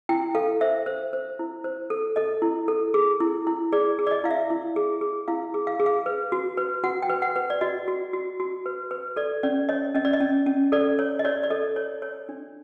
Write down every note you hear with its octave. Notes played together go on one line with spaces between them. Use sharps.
E4 G5
A4 F5
C5 E5
C5
C5
E4
C5
A4
A4 D#5
E4
A4
G#4
E4
E4
G#4 D5
G#4
D5
D#5
E4 F5
E5
E4
G#4
G#4
E4 F5
G#4
F5
G#4
F5
B4
F#4
B4
F#4 F#5
G5
B4
F#5
B4
D5
F#4 D#5
F#4
F#4
F#4
B4
B4
A4 D5
C#4 D5
C#5 D#5
C#4 D#5
D5
D#5
C#4
C#4
A4 D5
C#5
D#5
C#5 D5
D5
A4 D#5
C#5
C#5
D4